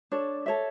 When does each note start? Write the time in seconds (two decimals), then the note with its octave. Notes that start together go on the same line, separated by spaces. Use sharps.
0.12 D4 A4 C#5
0.46 A4 C#5 E5